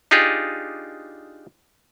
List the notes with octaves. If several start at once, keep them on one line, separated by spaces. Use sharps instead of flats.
D4 D#4 F4 G4 G#4